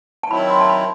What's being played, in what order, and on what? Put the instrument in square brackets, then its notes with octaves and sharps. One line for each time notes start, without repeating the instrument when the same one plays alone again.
[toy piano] A5
[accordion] D#3 F#3 C4 E4 [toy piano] B5
[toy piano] C6
A5
B5